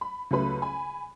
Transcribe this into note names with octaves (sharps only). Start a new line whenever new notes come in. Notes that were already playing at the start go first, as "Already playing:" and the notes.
B5
C#2 F#3 A3 B4 B5
G#5 B5